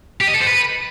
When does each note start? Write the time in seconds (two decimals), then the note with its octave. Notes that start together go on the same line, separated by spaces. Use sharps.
0.21 G4
0.27 D#5
0.34 A4
0.41 C5
0.47 B4